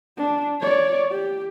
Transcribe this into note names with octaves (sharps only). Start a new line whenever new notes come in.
D4
C#5 D5
G4